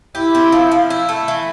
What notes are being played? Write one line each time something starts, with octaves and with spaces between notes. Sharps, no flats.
E4 G4
C4
F3
F3
E4
A3
E3